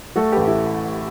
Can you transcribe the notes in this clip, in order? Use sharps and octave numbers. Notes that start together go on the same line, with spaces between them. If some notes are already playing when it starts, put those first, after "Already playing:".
A3 F#4 A4
A1 G4 B4
E4 G4